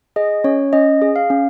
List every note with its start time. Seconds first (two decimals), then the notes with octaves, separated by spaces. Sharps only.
0.16 G#4 D#5
0.44 C#4 C#5
0.73 C#4 D#5
1.02 G#4
1.16 F5
1.30 C#4